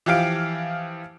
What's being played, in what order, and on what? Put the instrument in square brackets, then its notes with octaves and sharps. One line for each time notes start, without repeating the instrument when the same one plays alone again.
[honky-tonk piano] E3 F3 G4 F5 D7